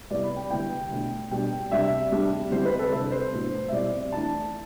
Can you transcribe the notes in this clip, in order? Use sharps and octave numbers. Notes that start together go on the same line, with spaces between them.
C3 G3 B3 E4 D5
B5
G5
D3 G3 B3 E4 G5
B2 A3 D4
B2 G3 D4 G5
C3 G3 D4 E5
C3 G3 D4
D3 G3 C4 E4 C5
B4
A4
C3 G3 D4 B4
C5
A2 F#3 B3 D4
E5
B2 G3 C4 E4 D5
E3 A3 D4 A5